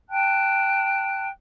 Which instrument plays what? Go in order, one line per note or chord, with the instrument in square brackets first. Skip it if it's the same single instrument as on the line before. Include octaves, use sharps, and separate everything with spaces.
[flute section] G5 A5 F#6